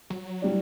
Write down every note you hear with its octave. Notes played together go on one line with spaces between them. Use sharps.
F#3
A2 G3 D4